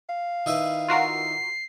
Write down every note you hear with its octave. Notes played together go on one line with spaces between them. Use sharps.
F5
D#3 E4 B4
F4 F#4 A#4 C7